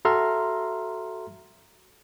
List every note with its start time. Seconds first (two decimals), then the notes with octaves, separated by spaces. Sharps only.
0.05 F#4 A4 E5 A#5 C6 F6